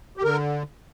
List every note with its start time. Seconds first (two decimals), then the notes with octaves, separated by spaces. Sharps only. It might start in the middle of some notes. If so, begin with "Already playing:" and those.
0.17 G4
0.23 D3 A#4